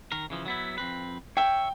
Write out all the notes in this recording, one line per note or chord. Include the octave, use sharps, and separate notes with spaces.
D#3 A#4
C#3 E3 F3
F#3 B3 E4
F2 C4 B4
C#5 E5 G5